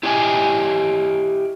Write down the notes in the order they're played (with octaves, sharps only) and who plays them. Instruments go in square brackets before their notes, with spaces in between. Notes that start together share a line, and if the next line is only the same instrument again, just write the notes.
[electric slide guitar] E4 G4 D5 D#5 G#5